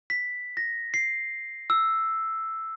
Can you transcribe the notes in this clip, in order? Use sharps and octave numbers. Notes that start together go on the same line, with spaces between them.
B6
A#6
C7
E6